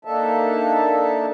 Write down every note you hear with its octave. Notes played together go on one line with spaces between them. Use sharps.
A#3 D4 D#4 A4 E5 A5